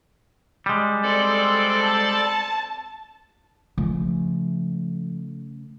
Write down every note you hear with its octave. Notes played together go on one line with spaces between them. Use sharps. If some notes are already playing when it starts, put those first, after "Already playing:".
G3 G#3
C4 A4 D5
A5
C#3 F3 A3